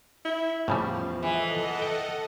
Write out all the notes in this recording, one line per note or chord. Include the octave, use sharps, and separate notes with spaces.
E4
E2 A2 C#3 F3 G3
E3 A4 D#5 F#5
G5